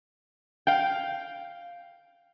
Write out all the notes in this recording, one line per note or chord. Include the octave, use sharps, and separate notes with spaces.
F5 G5